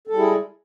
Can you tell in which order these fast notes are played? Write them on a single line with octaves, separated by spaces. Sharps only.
A4 G3 G#3 E4 G#4